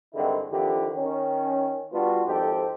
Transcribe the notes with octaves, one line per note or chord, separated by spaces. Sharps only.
G2 D3 D#3 G#3 C4 E4
F2 D3 D#3 E4 G4
D#3 C#4
G3 B3 D4 F4 F#4
G#1 F2 D#4 G4 A4 C5